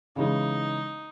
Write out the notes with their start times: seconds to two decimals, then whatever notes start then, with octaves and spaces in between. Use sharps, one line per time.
0.16 C#3 E3 G#3 D#4